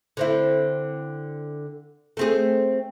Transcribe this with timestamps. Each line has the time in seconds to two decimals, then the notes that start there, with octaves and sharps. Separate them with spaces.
0.17 D3 C4 E4
2.17 A3 C4 G#4